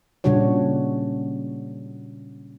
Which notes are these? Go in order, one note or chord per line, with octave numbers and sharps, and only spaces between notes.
A#2 C#3 G3 D4 F#4 C#5